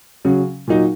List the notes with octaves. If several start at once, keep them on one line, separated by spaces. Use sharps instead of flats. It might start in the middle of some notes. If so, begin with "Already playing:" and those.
C#3 F#3 C#4
A#2 F#3 D#4